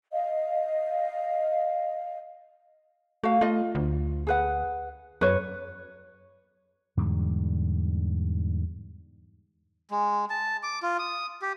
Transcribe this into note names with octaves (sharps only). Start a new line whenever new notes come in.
D#5 F5
A3 F#4 F5
A3 F4 D#5
D2
G#4 B4 F#5
F#2 B4 C#5
E2 G#2 D3 G3
G#3
A5
D6
F4
D#6
G4